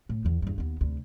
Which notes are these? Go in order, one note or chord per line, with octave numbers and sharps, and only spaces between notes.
A2
E2 E3
E2 G2
D#2 B3
D2 C3